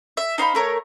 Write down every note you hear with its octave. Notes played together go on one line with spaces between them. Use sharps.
E5
D#4 C5 F5 B5
A3 A#4 C#5